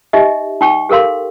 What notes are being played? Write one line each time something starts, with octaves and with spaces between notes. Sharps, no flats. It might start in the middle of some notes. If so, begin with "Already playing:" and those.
D#4 G4 D#5 E5
D#4 G5 C#6
G4 A4 A#4 F5 C6